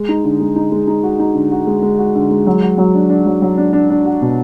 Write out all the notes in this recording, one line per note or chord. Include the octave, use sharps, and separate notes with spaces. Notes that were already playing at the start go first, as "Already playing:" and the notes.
Already playing: G#3
D#4
D3
G#3
D#4
G#3
D#4
F#4
D#4
D3
F#4
G#3
G#3
F#4
D3
G#3
F#3
F#4
F#3
D4
D4
F#3
F#3
D4
D4
D4
F#4
B2